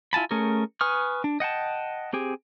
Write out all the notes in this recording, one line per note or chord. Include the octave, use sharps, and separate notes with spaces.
E4 F4 G#5 A5 B5
A3 C#4 G#4 A#4
B4 G#5 C#6 D#6 F6
D4
D#5 F#5 G5 A5
C4 G4 G#4